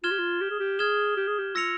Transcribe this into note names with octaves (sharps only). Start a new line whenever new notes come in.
F4 F6 G#6 E7 G7
G4
F4
G4
G#4
G4
G#4 F6 G#6 E7 G7
G4
G#4
G4
F4 E6 A#6 C#7 F7